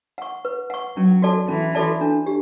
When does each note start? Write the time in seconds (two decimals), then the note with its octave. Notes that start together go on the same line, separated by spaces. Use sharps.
0.18 F#5 C#6
0.45 B4
0.70 F#5 C#6
0.96 F#3 C#4
1.22 F#4 A4 D5 A5
1.48 E3 C#4
1.75 F#4 A4 D5 A5
2.01 D4
2.27 G4